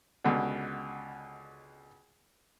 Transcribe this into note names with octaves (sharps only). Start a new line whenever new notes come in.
C#2 B2 D3